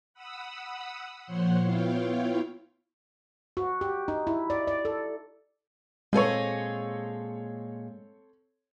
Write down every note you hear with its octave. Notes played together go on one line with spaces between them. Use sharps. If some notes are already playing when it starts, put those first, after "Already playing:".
F#5 B5 D#6 E6
A#2 F3 C5 C#5 F#5 C6
B3 E4 F4 C#5 F5 G5
F#4
G4
D#4
E4
D5
D5
A4
A#2 G#3 C4 G#4 A4 C#5 D#5